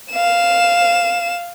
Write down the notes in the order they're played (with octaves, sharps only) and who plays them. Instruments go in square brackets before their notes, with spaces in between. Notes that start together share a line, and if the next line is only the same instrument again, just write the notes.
[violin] F5 E7